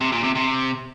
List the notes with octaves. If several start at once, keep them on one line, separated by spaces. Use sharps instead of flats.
C3
A#2
C3
C3